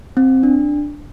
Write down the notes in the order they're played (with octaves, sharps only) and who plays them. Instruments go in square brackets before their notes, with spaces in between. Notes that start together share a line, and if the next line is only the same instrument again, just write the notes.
[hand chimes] C4
D4